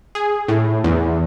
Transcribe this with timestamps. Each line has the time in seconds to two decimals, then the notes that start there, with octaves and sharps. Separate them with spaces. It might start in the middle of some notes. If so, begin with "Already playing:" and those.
0.15 G#4
0.48 A2
0.84 E2